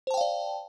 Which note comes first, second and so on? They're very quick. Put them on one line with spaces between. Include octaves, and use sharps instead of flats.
C5 A5 G5 F5 D5